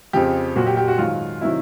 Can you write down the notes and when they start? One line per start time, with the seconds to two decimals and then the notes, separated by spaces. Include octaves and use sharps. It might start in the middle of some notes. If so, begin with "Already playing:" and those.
0.13 F2 C#3 F3 G4
0.56 A#2 F#3 F#4
0.67 G4
0.77 G4
0.88 F#4
0.98 G#2 D#3 F#3 F4
1.41 C3 D#3 F#3 E4